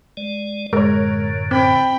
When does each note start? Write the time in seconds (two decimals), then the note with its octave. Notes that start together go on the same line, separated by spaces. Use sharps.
0.17 G#3 D5
0.73 F#2 A2 D3 G#3 A#4 C#5
1.51 C4 G5 B5